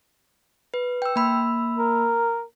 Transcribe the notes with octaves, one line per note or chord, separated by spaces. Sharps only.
B4
G5 E6
A#3 B5 E6
A#4